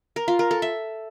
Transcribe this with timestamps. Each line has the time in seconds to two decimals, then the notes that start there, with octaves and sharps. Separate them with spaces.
0.16 A#4
0.28 F4
0.39 A#4
0.51 A4
0.62 E5